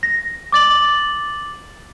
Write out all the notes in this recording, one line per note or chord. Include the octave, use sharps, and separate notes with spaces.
A#6
D6 A6 F#7